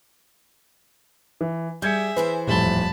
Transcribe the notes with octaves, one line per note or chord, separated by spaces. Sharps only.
E3
G3 G#4 E5 G6 G#6 C#7
E3 E4 B4 C5
D#1 F2 A2 G3 A3 A5 B5 G7